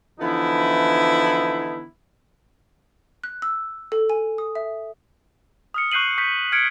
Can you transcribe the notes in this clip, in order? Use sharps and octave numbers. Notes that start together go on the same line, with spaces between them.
D3 E3 F3 B3 D#4 E4
F#6
E6
A4
G#5
D#6
E5
D#6 F6 C#7
C#6 F#6 G6 C7 D#7 F#7
C#6 D#6 G6 B6
F6 G#6 C#7 D7